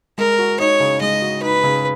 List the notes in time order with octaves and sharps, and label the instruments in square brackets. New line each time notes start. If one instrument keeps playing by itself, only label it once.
[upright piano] G#3 [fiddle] A#4
[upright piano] F#4
[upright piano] D#4 [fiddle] C#5
[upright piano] C#3
[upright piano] G#3 [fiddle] D#5
[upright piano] F#4
[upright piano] D#4 [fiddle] B4
[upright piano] C#3